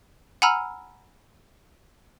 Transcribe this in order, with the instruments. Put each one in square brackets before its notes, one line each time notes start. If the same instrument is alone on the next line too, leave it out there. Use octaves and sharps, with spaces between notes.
[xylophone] F#5 G#5 A#5 B5 E6 F6